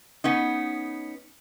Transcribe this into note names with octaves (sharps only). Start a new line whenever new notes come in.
B3 C#4 D#4